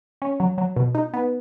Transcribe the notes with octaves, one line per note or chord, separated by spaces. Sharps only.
C#4
F#3
F#3
B2
D#4
B3